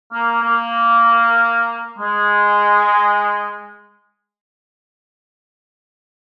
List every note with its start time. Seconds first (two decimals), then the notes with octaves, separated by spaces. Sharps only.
0.12 A#3
0.42 A#3
1.98 G#3